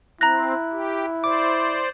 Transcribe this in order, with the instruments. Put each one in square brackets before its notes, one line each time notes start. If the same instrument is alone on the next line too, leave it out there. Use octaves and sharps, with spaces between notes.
[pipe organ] C4 [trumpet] E4 [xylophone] A#5 A#6 [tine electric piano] F#6
[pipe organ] G4
[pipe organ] C5 D5 [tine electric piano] D6